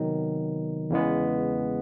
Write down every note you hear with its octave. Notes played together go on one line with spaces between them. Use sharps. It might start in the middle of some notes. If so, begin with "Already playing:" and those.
Already playing: C3 D#3 F#3 B3 D#4
E2 C#3 E3 G#3 B3